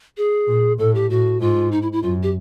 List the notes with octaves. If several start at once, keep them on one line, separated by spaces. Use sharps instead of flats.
G#4
A#2
A2 A4
G4
A2 F#4
G#2 F4
D#4
E4
E4
F#2 F4
G4